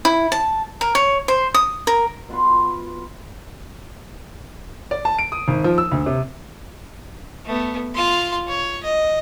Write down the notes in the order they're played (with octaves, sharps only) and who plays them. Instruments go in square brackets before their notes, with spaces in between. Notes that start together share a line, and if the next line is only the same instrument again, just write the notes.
[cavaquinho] E4
A5
A#4
C#5
C5
D#6
A#4
[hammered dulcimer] B2 F4 B4 C6
[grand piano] D5
A5
D7
D#6
G#1
F3
E6
D2
C3
[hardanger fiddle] A3 B3
F4 C6
C#5
D#5